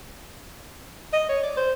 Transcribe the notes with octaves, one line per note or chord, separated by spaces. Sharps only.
D#5
C#5
D5
C5